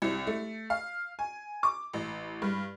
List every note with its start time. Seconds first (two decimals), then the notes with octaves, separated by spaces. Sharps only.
0.02 C2
0.27 A3
0.70 F5
1.19 G#5
1.63 D6
1.93 A1
2.42 G2